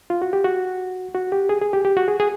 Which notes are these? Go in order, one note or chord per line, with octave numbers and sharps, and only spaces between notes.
F4
F#4
G4
F#4
F#4
G4
G#4
G#4
G4
G4
F#4
G#4
G#4